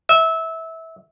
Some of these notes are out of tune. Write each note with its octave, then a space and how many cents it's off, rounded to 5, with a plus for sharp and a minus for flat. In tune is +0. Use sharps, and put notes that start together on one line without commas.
E5 -20